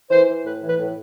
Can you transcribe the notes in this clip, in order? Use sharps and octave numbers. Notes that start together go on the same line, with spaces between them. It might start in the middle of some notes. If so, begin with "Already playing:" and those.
E3 C5
E3
A2 B4
E3
B4
A2